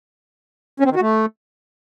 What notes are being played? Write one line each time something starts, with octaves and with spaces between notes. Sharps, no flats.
C#4
C4
D#3
F#4
A3